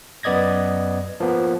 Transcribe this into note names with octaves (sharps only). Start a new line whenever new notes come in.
F#2 B3 D5 D#5 G#6 A#6
F3 A#3 B3